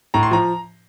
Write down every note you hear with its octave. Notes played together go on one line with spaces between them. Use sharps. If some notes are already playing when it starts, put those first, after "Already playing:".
A2 A#5
C6
F3 A#5